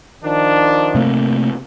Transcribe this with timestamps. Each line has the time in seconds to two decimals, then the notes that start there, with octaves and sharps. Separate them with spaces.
0.23 D#3 F3 D4
0.95 C3 A3 A#3